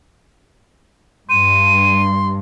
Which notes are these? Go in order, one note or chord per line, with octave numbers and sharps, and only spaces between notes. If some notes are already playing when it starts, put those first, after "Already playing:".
G2 C6 D#7